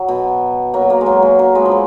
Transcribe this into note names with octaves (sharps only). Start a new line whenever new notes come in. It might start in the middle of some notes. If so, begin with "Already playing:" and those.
Already playing: F#3
B2
F#3 A#3
F#3 A#3
G#3
F#3 A#3
F#3 A#3
F#3 A#3
G#3 B3
F3
F#3